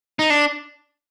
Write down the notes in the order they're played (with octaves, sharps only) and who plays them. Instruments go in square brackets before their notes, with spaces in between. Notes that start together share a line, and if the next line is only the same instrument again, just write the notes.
[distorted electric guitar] D#4
D4